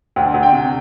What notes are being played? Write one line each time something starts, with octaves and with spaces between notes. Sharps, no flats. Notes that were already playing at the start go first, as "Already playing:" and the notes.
D2 G5
D2
G5
C3